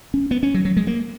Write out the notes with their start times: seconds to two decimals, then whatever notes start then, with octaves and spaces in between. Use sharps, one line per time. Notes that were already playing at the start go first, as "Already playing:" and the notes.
0.14 C#4
0.31 B3
0.43 C#4
0.54 F#3
0.65 F#3
0.77 G#3
0.87 A#3